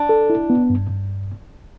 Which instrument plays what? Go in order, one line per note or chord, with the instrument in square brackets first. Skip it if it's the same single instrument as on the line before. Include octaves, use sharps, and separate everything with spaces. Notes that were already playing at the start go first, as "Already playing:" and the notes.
Already playing: [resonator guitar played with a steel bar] D4
[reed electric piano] A4
E4
B3
G2
G2